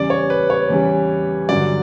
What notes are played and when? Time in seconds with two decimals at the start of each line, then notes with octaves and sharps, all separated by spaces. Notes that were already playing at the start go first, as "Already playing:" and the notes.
Already playing: E2 C#3 E3 G3 D5
0.10 C#5
0.30 B4
0.50 C#5
0.70 E2 C#3 E3 G3
1.49 G2 D3 F#3 D5